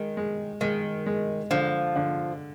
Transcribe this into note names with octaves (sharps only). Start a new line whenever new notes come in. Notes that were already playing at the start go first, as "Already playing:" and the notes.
Already playing: D#3 G#3
G#3
D#3 G#3
G#3
D3 F3
D3